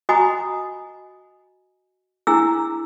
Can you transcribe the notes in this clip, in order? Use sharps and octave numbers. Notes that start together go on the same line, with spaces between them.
F#4 D#5 G#5 A#5 B5 D#6
D4 E4 G#4 A#5 E6